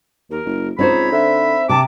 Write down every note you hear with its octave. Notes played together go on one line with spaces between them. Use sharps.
D#2 A#4
F#1
C#2 C4 D#4 C5 C#5 B5
D3 E5
C3 A5 D6